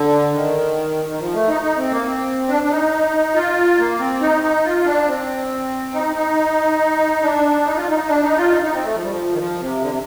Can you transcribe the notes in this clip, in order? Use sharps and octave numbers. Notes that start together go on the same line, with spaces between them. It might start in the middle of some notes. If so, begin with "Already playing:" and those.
Already playing: D3
D#3
D#3
F3
A3
D#4
D#4
C4
A#3
C4
D4
D4
D#4
F4
A#3
C4
D#4
D#4
F4
D4
C4
D#4
D#4
D4
D#4
F4
D#4
D4
D#4
F4
D#4
D#4
C4
A3
F3
G3
F3
D#3
F3
C3
D3
C3